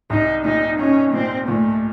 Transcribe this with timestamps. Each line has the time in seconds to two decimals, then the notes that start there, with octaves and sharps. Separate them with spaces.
0.10 C2 D#4
0.45 A#2 D#4
0.79 C#4 D#4
1.13 A#2 C4
1.48 A#2 A3